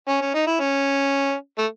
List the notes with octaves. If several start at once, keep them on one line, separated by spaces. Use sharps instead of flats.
C#4
C#4
D#4
E4
C#4
A3